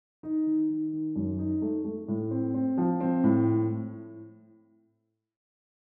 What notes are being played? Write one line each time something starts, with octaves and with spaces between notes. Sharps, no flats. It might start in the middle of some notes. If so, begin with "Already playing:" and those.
D#4
D#3
D#3
D#3
F#2
D#4
A3
A3
A2
C4
C4
F3
C4
A2